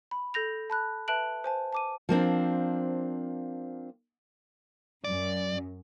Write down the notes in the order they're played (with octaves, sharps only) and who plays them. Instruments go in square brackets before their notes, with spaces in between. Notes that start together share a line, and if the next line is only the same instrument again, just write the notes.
[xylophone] B5
A4 G6 A#6 F7
A5 B5 F#6
B4 E5 A5 F#6 D7 F#7
C5 G#5 A5
A5 D6 D#7
[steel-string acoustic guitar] F3 A#3 C4 D4
[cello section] F#2 [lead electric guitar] D5